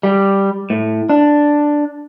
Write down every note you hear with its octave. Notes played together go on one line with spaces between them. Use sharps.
G3
A2
D4